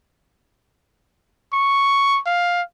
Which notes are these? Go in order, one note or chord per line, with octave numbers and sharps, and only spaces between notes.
C#6
F5